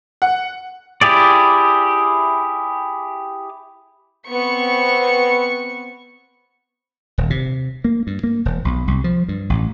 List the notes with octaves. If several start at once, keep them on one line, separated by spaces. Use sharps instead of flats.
F#5
E4 G4 G#4 D5
B3 C4 C#6 C#7
D#1
C3
A#3
G2
A#3
E1
B1
C2
F3
G2
A1